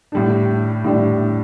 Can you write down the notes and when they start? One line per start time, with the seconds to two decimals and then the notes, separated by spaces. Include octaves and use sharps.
0.12 A2 G3 D4
0.84 A2 G3 D4